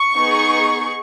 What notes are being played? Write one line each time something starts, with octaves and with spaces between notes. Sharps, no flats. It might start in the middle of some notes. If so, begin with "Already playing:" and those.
Already playing: C#6
B3 D#4 G#4